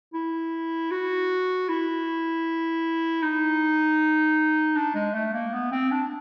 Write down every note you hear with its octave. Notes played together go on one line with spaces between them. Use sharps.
E4
F#4
E4
D#4
D4
G#3
A3
A#3
B3
C4
D4